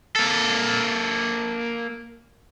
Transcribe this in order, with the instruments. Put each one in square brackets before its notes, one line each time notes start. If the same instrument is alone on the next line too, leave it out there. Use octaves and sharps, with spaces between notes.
[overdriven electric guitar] A#3 A4